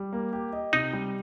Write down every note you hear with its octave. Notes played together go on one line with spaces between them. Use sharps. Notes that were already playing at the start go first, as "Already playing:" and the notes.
Already playing: G3
A#3
G4
D#5
C3 D#4
G3